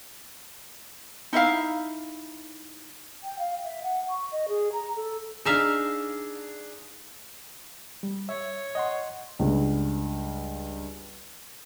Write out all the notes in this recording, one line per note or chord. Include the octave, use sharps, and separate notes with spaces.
D#4 E4 E5 F5
G5
F5
E5
F#5
C#6
D#5
G#4
A#5
A4
D4 D#4 G#4 E5 F5
G3
C#5 E5
D#5 F#5 C6
C#2 G2